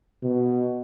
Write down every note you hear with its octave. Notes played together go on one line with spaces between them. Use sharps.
B2